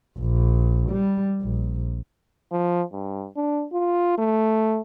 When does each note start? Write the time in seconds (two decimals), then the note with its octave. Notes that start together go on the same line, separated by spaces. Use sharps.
0.19 A#1
0.91 G3
1.42 A#1
2.52 F3
2.93 G2
3.36 D4
3.73 F4
4.18 A3